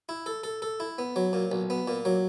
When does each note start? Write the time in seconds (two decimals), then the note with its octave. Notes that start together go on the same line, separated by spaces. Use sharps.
0.09 E4
0.26 A4
0.44 A4
0.62 A4
0.80 E4
0.98 B3
1.16 F#3
1.33 A#2
1.52 B1
1.70 B3
1.88 A#2
2.05 F#3